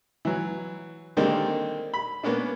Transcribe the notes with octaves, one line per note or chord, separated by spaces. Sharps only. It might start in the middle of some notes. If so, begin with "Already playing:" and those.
E3 F#3
D3 D#3 G3 G#3 A#3 C4
B5
A#3 B3 C#4 D4